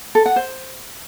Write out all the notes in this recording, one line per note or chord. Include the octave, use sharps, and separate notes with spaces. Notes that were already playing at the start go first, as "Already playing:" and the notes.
A4
F#5
C5